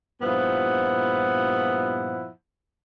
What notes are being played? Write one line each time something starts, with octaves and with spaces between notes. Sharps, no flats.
G2 A#2 F3 B3 E4 F#5